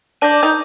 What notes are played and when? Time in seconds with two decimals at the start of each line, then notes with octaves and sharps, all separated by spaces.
0.21 D4 D6 G6 A#6 D#7
0.43 D#4